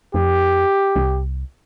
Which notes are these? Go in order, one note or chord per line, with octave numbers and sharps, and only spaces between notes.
F2 G4
C2